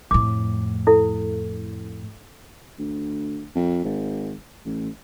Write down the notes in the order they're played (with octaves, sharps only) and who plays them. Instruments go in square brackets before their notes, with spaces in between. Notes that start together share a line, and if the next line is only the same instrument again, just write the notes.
[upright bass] F2 A2 [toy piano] D6
[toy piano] E4 A4
[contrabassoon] D2
F2
G#1
A1